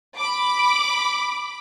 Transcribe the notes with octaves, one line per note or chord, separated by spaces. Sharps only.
B5 D6